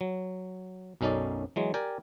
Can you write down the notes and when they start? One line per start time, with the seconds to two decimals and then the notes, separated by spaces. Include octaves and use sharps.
0.01 F#3
1.01 B1 F#2 C#4 D#4 A4 D5
1.56 E3 F#3 G#3
1.74 G4 A#4 D5 G5 G#5